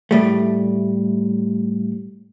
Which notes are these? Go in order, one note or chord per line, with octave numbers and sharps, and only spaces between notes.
A2 G3 A3